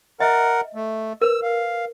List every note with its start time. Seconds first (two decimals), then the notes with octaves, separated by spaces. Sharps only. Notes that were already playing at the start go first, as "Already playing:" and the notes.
0.20 A#4 D#5 E5 F#5
0.75 A3
1.22 A#4 B4 E6
1.43 F5